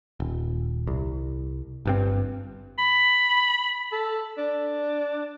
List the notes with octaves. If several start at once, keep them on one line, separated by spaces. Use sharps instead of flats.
D#1
C2
G1 G2 C4
B5
A4
D4